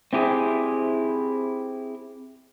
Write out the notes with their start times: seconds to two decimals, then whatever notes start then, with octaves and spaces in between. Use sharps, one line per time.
0.13 C4 E4 G4 G#4